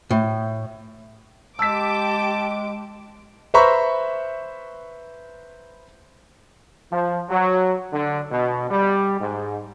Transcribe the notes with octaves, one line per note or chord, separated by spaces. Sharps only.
A2
G#3 G4 A5 D6 E6 B6
B4 C5 E5 A#5 B5 C#6
F3
F#3
D3
B2
G3
G#2